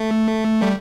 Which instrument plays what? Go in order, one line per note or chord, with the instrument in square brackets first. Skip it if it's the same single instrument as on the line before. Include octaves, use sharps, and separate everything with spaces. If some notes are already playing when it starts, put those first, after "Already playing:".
Already playing: [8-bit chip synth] A3
G3